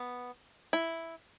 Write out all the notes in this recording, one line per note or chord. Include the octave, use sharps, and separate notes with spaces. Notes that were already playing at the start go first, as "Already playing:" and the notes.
Already playing: B3
E4